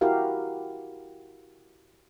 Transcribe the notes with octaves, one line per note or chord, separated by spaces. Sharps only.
E4 F#4 G4 A#4 F5